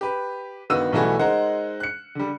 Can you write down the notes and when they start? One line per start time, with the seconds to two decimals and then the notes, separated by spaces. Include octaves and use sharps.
0.01 G4 B4
0.70 G1 D#3 B3 F#4 E6 D#7
0.92 B1 E3 G3 A3 F#4 G#5
1.19 G#3 D#4 A#4 C5 F#5
1.80 F#6 C#7
2.15 D3 G3